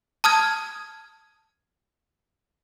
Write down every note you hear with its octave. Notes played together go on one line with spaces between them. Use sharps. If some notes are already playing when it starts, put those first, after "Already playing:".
A5 D#6 F6 G#6